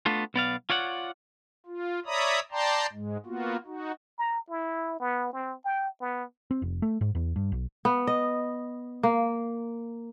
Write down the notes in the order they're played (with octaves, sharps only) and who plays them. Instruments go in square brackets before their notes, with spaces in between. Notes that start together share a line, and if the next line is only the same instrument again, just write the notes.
[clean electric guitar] A3 B3 D4 F4
B1 B3 D5 F5
F4 C#5 D5 F#5
[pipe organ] F4
C#5 D5 E5 A#5 B5 D#6
D5 G5 A5 A#5 C6
G#2 G#3
A#3 B3 F4 F#4
D#4 F#4
[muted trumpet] A#5
E4
B3
C4
G5
B3
[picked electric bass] C4
F1
A3
G#2
E2
G2
B1
[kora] B3
D#5
A#3